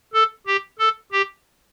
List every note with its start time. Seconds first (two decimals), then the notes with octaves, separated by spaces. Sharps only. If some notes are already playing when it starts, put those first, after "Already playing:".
0.14 A4
0.47 G4
0.79 A4
1.12 G4